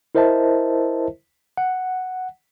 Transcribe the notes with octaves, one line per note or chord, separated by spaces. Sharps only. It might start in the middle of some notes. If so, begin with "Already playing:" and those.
E4 A#4 C5 D#5 E5 A5
F#5